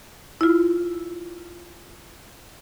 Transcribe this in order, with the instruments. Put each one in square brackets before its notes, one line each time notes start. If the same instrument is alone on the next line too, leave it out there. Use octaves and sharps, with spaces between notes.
[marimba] E4 F4